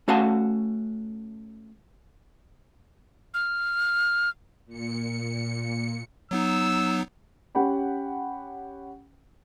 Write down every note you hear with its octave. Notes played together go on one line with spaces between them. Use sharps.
A3 C#4 F#4 F5 F#5 A5
F6
A#2 C#7
F#3 B3 D#4 E6
C#4 G4 F#5 G5 B5